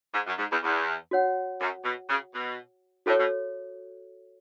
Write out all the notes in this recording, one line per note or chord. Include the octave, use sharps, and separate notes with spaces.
G#2
F#2
G#2
E2
E2
F#4 C#5 F#5
F#2
B2
C#3
B2
A2 F#4 A4 C#5
B2